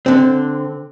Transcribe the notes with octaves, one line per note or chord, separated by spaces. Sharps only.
D3 C4